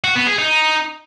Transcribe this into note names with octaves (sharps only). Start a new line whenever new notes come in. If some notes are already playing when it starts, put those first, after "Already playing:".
F#4
B3
G#4
D#4